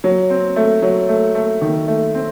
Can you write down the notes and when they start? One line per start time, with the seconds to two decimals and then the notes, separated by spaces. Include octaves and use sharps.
0.04 F#3
0.30 C4
0.56 A3
0.82 F#3
1.09 A3
1.35 A3
1.62 D#3
1.88 A3
2.15 C4